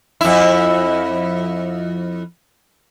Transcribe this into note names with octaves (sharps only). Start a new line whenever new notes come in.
F2 E4